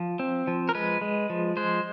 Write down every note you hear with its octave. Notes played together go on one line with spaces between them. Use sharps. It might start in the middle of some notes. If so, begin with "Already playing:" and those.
Already playing: F3
C4
F3
A#4
G#3 B4
G#3
F3
G#3 C5